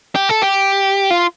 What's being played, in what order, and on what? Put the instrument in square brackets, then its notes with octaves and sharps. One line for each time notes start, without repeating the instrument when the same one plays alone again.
[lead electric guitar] G4
A4
G4
F4